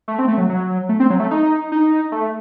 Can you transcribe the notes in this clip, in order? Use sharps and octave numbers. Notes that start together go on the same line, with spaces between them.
A3
C4
A3
F#3
F#3
A3
C4
F#3
A3
D#4
D#4
A3